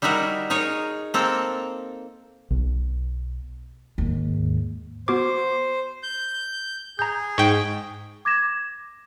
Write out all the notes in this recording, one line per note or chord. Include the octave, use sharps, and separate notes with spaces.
G3 D#4 E4 F#4 A#4
D#4 G#4 A#4 C#5
A#3 C4 A4 A#4
B1
D#2 G#2
B3 F#4 C5 D6
G6
G#4 A#5 G6
G#2 G5 C#6
D6 G#6 A#6 E7